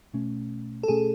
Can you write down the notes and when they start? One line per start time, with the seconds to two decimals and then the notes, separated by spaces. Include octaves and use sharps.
0.13 B2 A3 C#4
0.83 A4
0.88 B2 A3 C#4 G#4